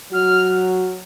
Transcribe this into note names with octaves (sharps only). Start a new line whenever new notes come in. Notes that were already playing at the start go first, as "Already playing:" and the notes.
F#3 F#4 F6